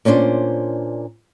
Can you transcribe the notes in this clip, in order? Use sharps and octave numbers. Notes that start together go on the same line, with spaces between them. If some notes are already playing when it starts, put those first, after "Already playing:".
A#2 C#4 D4 F#4 C5